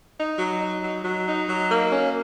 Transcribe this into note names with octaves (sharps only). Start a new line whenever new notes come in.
D#4
F#3
D#4
F#3
F#3
D#4
F#3
A#3
C#4